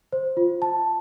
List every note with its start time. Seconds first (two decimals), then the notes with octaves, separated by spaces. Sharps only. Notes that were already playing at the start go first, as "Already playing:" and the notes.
0.12 C5
0.37 F4
0.62 A5